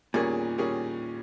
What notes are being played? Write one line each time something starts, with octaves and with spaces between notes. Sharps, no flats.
E2 A#2 D#3 G3 C#4 G#4
D#3 G3 C#4 G#4